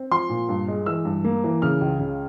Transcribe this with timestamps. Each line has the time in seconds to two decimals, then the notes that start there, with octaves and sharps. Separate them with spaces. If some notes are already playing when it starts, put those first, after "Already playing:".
Already playing: C4
0.11 F3 C6
0.29 A#2
0.49 G2
0.68 G#3
0.86 E3 E6
1.05 G2
1.24 A#3
1.44 E3
1.62 C#3 F6
1.81 C#2
2.00 C#3